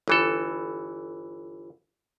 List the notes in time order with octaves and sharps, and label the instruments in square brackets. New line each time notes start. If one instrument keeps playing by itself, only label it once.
[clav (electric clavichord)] G1 E3 A4